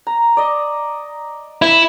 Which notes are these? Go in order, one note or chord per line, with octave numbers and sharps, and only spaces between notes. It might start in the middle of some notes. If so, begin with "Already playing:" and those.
A#5
D5 D#5
E4 B4